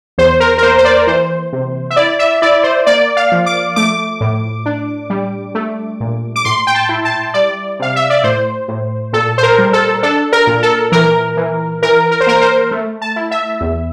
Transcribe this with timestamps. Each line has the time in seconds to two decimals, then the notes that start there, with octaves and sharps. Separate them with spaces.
0.18 E2 C5
0.40 A#4
0.58 A#4
0.62 A#3 C5
0.78 C5
0.85 D5
0.98 A#4
1.07 E3 C5
1.53 C3
1.90 E5
1.96 E4 D5
2.19 E5
2.42 E4 D5
2.64 C5
2.87 A#3 D5
3.17 F5
3.32 F3
3.46 D6
3.76 A3 D6
4.21 A2
4.66 D4
5.10 G3
5.55 A3
6.00 A#2
6.36 D6
6.45 A2 C6
6.67 G5
6.75 A5
6.89 E4
7.05 A5
7.34 G3 D5
7.79 C3 F5
7.96 E5
8.10 D5
8.24 A2 C5
8.68 A2
9.13 A#2 A4
9.38 C5
9.43 A#4
9.58 G3
9.73 A4
10.03 D4 A4
10.33 A#4
10.47 A#2
10.63 A4
10.92 E3 A#4
11.37 E3
11.82 E3 A#4
12.11 A#4
12.20 C5
12.27 A#3 A#4
12.42 C5
12.71 A3
13.02 A5
13.16 E4
13.31 E5
13.61 E2